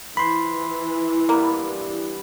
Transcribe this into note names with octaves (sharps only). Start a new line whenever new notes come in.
E3 F4 B4 C5 B5 C6
G2 G3 A#3 B3